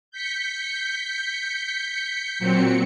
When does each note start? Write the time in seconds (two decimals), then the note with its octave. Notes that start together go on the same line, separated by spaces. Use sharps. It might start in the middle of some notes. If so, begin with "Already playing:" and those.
0.11 G6 B6 C#7
2.39 A#2 F#3 C4 C#7